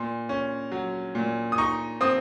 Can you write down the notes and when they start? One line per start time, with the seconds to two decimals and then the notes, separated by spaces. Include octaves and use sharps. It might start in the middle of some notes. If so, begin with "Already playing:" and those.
Already playing: A#2 C6
0.29 C#4
0.72 F#3
1.15 A#2
1.52 D#6
1.58 D#4 C#6
2.01 C4 D#6